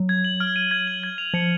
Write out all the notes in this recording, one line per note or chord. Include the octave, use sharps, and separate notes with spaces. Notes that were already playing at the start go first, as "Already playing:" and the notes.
Already playing: F#3
G#6
F#7
F6
D#7
G#6
F#7
G#6
F7
F3 C#7